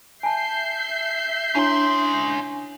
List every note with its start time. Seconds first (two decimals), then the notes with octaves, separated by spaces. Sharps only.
0.23 E5 G#5 A5 G6 C7
1.55 C#4 D4 E4 C#5 C6